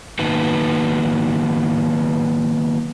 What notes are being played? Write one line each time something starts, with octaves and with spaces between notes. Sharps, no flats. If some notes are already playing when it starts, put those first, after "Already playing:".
D#3 F#3 A#3 B3 D#4 B4